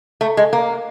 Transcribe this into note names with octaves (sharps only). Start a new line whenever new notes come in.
A3
G#3
A#3